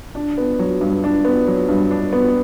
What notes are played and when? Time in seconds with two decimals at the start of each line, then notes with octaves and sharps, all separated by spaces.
0.15 D4
0.38 B3
0.59 F#3
0.81 G2
1.04 D4
1.25 B3
1.47 F#3
1.69 G2
1.91 D4
2.13 B3